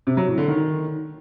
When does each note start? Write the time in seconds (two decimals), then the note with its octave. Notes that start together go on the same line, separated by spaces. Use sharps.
0.07 C3
0.17 F#3
0.27 A2
0.38 D3
0.48 D#3